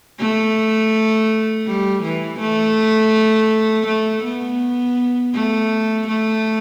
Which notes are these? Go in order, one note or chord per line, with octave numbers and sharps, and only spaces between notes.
A3
G3
E3
A3
A3
B3
A3
A3